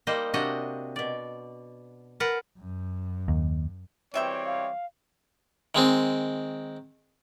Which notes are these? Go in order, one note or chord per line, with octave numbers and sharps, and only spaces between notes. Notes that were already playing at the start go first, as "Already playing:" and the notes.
G3 A#3 D#4 C5 D#5
C3 D4 F#4 D#5
B2 D5
A#4 B4 F#5 A5
F#2
D#2
B2 E3 G3 C4 C#5 E5 G5
F5
D#3 G#3 C4